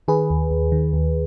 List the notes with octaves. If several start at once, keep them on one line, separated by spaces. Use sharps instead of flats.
D#3 G#4 B4
D#2
D#2
D#3
D#2